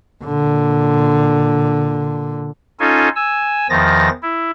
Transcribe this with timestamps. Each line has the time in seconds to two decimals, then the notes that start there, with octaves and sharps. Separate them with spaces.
0.24 A#2 D3
2.80 C#4 D#4 F4 A4 G#5
3.16 G#5 E6
3.70 E2 D#3 F3 A6 A#6
4.23 E4